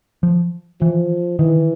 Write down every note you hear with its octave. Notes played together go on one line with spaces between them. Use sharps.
F3
E3 F3
D#3 E3